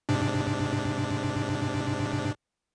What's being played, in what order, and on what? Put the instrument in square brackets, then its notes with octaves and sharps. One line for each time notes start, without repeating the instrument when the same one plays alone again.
[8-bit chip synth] G#2 C3 D4